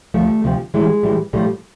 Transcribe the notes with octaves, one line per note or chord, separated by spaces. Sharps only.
D2 C3 F3 G3 A3
D2 C3 F3
A2 E3 G3 G#3
A2 E3 G3
A2 F3 G3 A3